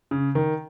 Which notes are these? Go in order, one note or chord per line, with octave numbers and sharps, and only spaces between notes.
C#3
D#3